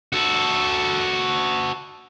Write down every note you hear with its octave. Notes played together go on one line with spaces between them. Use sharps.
F#4 A4